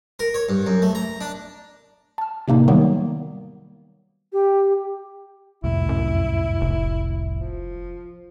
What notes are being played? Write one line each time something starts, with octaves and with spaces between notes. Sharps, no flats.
A#4
C#5
G2
F#2
A3
A#5
D4
A5 F6
A2 C3 A#3 D#4
D#3 F#3 G3 A#3 B3
G4
C2 F2 A2 E4
F#2
F1
F3